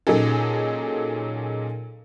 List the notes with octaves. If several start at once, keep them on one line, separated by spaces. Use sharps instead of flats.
A#2 F#3 C#4 D#4 G#4 A4